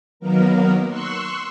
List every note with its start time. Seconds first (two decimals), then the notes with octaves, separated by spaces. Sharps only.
0.20 D#3 F#3 A#3 B3 A#4
0.88 C6 C#6 E6 F#6